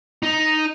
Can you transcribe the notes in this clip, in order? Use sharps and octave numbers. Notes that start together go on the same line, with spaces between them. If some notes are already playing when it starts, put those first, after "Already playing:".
D#4